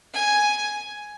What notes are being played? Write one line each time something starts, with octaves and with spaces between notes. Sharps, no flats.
G#5